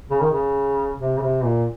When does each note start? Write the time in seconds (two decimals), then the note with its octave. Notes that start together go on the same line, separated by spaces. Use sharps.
0.10 C#3
0.21 D#3
0.31 C#3
0.99 C3
1.17 C#3
1.22 C3
1.44 A#2